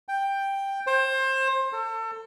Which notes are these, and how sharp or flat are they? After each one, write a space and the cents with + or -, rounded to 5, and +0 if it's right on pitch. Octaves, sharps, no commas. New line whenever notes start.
G5 +5
C5 +25
A4 +30